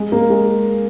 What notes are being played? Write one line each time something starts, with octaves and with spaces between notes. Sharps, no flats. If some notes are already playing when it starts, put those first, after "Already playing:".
Already playing: G#3
A#3
G#3